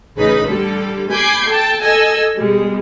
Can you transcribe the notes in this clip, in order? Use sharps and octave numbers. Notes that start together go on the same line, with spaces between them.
A1 C#3 D#4 B4 B5
D3 G3 A4
G#5 B5 D6 G6 G#6 C7
A4 G5 A5
A4 D#5 G#5 E6
B2 G3 G#3